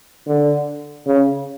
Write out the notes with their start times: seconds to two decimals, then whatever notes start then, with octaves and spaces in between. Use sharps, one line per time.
0.27 D3
1.06 C#3